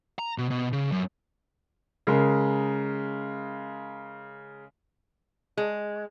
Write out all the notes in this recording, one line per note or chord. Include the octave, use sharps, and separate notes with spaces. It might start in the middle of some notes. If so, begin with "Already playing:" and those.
A#5
B2
B2
C#3
F#2
C#3 G#3 A#4
G#3